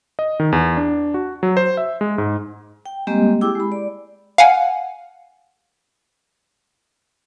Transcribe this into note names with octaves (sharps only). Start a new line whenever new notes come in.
D#5
D#3
E2
D4
F#4
F#3
C5
E5
G#3
G#2
G5
G3 G#3 A#3 C4 G4 D#5
E4 G4 G#4 G5 D6 E6
G#3 B5
D5
F5 F#5 G#5